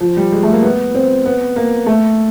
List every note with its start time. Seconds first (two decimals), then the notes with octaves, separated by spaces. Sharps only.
0.01 F3
0.17 G3
0.32 G#3
0.43 A3
0.53 A#3
0.63 B3
0.94 C4
1.25 B3
1.56 A#3
1.86 A3